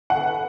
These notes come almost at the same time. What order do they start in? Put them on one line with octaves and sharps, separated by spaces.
F#5 A4 B4